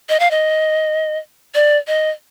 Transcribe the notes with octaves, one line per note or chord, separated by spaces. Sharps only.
D#5
F5
D#5
D5
D#5